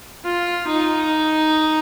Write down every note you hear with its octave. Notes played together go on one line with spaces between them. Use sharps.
F4
D#4